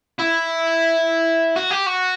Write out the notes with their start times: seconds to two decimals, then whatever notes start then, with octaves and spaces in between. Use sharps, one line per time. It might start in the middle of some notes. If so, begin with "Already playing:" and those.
0.19 E4
1.56 F#4
1.71 G4
1.87 F#4